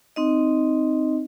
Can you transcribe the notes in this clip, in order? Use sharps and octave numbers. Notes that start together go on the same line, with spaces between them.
C4 D#4 D#5